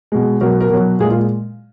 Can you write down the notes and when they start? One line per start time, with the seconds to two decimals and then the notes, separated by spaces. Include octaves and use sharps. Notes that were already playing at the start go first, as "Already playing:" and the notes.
0.12 B2 G#3
0.41 B2 F#3 A#4
0.61 A#4
0.70 B2 F#3
0.99 A#2 G#3 G#4
1.10 F4